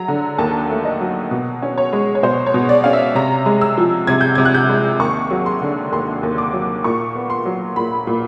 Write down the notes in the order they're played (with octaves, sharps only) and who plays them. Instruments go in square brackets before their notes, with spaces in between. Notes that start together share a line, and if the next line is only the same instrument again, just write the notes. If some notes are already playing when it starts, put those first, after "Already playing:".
Already playing: [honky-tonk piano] F#3 A#5
D3
D#2 A5
A3
D#5
F#3
B2
C#4
C#5
G#3
C#5
B2 C5
C#5
B2
D5
C#4 F5
E5
C3 A#5
G#3
E6
F3
C3 G#6
G6
C3 G#6
F#6
G6
G#3
D#2 C#6
F#3
C6
D3
D#2 C6
D#2
D6
F#3
A#2 C#6
B3
C6
F#3
A#2 B5
A#2